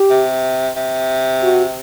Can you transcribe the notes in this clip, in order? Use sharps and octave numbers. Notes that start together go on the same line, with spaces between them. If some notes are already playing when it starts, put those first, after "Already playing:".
Already playing: G4
C3
C3
F#4